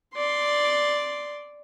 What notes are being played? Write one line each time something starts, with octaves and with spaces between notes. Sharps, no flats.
D5 C6